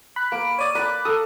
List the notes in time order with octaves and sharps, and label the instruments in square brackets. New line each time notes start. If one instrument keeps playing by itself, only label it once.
[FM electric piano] B5 [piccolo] F#6
[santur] A#3 [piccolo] D7
[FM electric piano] C#5 D5 D#6 [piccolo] D#7
[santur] A#4 D6 [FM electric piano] D5 B5 [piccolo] F#6
[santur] A4 [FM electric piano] D#6